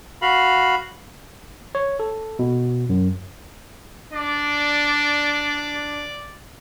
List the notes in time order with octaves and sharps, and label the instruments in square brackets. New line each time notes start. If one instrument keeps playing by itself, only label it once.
[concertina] F#4 F5 B5
[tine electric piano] C#5
A4
B2
F#2
[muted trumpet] D4 [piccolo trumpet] D5